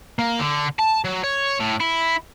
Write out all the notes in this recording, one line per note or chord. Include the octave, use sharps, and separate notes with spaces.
A#3
D3
A5
F#3
C#5
A2
E4